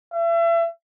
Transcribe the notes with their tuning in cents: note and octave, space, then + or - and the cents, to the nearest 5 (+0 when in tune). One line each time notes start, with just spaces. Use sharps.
E5 +35